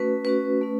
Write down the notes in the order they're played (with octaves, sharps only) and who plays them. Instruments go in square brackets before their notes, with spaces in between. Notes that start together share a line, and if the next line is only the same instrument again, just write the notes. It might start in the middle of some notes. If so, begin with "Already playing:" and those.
Already playing: [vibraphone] A3 C#4 F#4 B4
A3 C#4 F#4 B4
A3 C#4